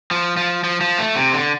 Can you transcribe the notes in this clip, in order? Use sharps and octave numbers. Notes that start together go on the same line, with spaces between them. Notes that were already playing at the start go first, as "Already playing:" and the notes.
F3
F3
F3
F3
A3
C3
D3